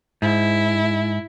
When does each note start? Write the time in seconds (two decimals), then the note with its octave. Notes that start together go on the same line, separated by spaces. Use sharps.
0.22 G#2 E4